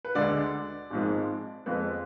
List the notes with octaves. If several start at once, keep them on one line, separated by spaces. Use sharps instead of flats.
B4
D2 D3 G#3 D5
G#1 G#2 F3 G#3
F2 F3 G#3 B4